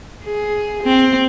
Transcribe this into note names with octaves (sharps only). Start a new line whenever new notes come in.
G#4
C4